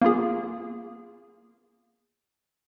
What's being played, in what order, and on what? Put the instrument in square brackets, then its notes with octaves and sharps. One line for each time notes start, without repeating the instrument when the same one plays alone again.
[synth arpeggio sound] A#3 B3 F4 G#4